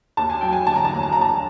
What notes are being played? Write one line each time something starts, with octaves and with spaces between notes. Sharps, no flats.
D#2 A5
G#5
F#3 G5
G#5
D3 A5
A#5
A5
D#2 A#5
A5
D#2 A#5
A5